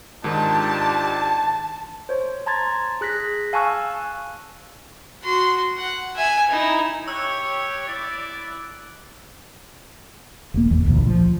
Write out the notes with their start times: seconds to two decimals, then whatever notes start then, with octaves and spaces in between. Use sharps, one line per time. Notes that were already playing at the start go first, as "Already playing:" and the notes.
0.24 G#2 D#3 D4 F4 G4 A5
2.09 C5 C#5
2.46 A5 A#5 C6 G#6 A6
3.01 G#4 F#6 A#6 B6
3.53 F5 G#5 A5 C#6 E6 F#6
5.23 F#4 C6
5.78 F#5
6.15 E5 G#5
6.50 D#4 E4
7.08 G4 C#5 E6 F#6
7.87 E4 D5
10.54 E1 A#3
10.70 A1 E2 E3
10.84 G#1 D2 A#2
11.08 F3